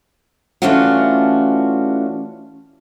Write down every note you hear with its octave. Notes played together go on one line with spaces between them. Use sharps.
E3 A3 C#4 D4 F4 F#4